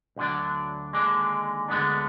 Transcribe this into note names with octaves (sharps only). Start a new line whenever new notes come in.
D2 D3 F#3 D4
D#2 D3 G#3 D4
D2 D3 G#3 B3 D4